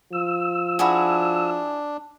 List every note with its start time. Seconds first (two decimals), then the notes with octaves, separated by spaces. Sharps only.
0.13 F3 E6
0.79 D4 E4 F#4 G#4